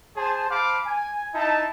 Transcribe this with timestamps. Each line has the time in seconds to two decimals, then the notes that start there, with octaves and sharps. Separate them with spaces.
0.16 G#4 C5 A5
0.49 C5 F5 A5 B5 D6
0.85 G#5
1.34 D#4 E4 A5